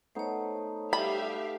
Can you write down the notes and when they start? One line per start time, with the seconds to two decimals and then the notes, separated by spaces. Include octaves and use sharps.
0.15 A3 B3 D#4 C5 C#5
0.93 G3 G4 E5 F5 B5